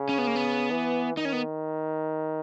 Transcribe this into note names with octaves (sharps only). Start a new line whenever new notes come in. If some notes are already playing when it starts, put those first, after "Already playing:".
Already playing: C#3
C#4
B3
A#3
B3
E3
D#3 D#4
C#4
B3